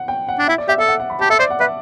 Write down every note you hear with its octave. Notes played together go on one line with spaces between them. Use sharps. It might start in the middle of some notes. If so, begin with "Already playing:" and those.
Already playing: F#5
G5
F#5
D4
E4 E5
D5
G4 E5
A4 E5
F#5
F#5
B5
G4 A5
A4 E5
C5 D5
F#5
B4 E5